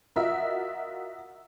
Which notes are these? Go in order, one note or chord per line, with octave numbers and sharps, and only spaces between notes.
F4 F#4 A#4 D#5 E5